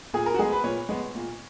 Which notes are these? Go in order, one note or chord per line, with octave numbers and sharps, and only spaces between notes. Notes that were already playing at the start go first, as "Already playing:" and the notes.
A#2 G#4
A#4
F#4
G#3 B3 G#4
B4
A#2 C#5
G#3 B3
A#2